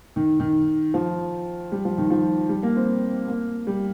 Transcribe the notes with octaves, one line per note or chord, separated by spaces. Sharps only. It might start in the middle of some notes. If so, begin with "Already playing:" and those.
D#3
D#3
F3
G3
F3
D#3
F3
G3
A#3
C4
A#3
G3